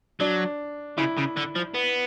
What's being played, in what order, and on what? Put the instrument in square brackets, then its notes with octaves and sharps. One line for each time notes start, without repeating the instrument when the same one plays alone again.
[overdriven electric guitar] F#3 [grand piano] D4
[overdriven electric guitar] C#3 [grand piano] E4
[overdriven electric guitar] C#3
D3
F3
B3